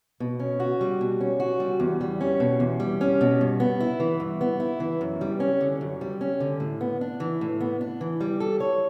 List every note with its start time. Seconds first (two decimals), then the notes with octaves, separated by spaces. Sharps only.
0.20 B2
0.40 C#4
0.60 F#4
0.81 G3
1.01 B2
1.21 C#4
1.40 F#4
1.60 G3
1.80 E2
2.01 G3
2.21 C#4
2.40 B2
2.60 E2
2.80 G3
3.01 C#4
3.21 B2
3.41 G2
3.60 B3
3.80 E4
4.00 E3
4.20 G2
4.41 B3
4.60 E4
4.80 E3
5.01 F#2
5.21 G3
5.40 C#4
5.61 D3
5.81 F#2
6.01 G3
6.21 C#4
6.40 D3
6.60 A2
6.81 B3
7.01 D4
7.20 E3
7.41 A2
7.61 B3
7.81 D4
8.01 E3
8.20 G3
8.40 A4
8.60 C#5